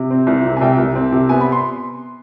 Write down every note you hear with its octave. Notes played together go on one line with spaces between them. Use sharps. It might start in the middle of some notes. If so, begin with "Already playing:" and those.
Already playing: C3
C4
C2
C3
G#5
C2 G5
C2
C4
C3
B3 G#5
B5
C6